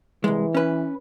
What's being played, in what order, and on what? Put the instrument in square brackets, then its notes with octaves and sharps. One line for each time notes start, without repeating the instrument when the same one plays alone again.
[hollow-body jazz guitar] C2 G#3 [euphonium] E3
[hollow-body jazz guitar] C#4 B4